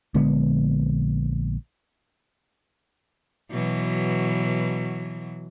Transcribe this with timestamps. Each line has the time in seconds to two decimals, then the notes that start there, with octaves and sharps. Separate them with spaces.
0.15 A#1 D3 G#3 B3
3.50 B2 E3 F#3